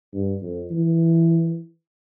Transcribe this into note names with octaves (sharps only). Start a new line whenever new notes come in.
G2
F2
E3